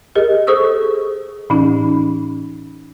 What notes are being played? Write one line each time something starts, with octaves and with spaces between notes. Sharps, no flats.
G4 G#4 A#4 D#5
G#4 A4 C5 C#6 D#6 E6
A2 E3 C#4 D#4